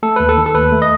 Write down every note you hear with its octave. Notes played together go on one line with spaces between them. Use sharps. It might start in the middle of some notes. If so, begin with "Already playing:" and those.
A3 A4
D#2 B4
A4
D#3
A4
D#2 B4
A3
D#5